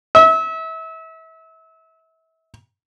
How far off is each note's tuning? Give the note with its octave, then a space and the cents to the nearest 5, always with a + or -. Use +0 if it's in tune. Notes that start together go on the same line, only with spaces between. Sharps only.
E5 -30